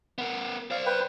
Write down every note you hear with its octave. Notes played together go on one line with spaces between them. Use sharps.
B3 A#4
C5 D5 F5
B4 G5